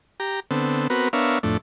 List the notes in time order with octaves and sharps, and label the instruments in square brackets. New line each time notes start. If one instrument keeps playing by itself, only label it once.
[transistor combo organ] G4 A#5
D3 B3 C4 A4
B3 C4 F#4 A#4 B4
B3 D4 A#4 C#5 E5 F5
F2 A2 A3 D4